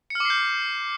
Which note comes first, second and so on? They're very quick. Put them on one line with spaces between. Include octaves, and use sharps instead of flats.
C#7 F6 D6 C7 G6